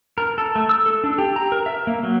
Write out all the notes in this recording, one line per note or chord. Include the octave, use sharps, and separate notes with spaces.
A#4
A4
A3
E6
A4
D4
G4
A#5
A#4
E5
A#3
F#3